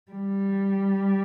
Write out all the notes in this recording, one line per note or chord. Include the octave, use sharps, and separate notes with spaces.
G3